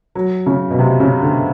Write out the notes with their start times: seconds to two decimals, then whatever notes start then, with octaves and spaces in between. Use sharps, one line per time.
0.15 F#3
0.46 C#3
0.71 B2
0.79 C3
1.00 C#3
1.22 D3